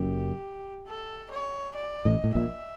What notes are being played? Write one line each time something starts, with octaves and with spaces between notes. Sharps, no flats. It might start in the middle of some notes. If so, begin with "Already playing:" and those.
Already playing: F#1 F#2 G4
A4
C#5
D5
A1 A2 D#5
A2
A#1 A#2 E5